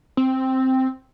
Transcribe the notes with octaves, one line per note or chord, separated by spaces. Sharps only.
C4